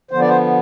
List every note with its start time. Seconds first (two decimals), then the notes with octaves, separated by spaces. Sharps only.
0.11 D3 F3 B3 C5
0.20 D5
0.28 C5